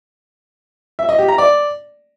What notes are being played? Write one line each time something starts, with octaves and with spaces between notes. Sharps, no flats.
E5
D#5
G4
A#5
D5